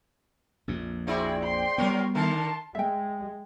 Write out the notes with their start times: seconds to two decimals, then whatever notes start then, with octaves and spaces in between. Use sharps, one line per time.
0.68 A#1 F2 A#2
1.07 C4 E4 F#4 G#4 D5
1.43 G5 C6
1.78 F#3 G3 B3 A#4 C#5
2.15 D3 D#3 A#4 A5 C6
2.75 G#3 E5 G5